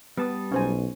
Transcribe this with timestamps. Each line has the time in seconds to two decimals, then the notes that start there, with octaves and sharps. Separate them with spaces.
0.17 G3 B3 A5 D#6
0.52 B1 C#4 C5 G#5